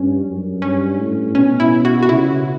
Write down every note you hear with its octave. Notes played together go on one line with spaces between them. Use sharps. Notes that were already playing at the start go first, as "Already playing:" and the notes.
Already playing: G2 C#4
F#2
G2 C#4
A2
B2 C#4
E4
F#4
F#4
C#3 E4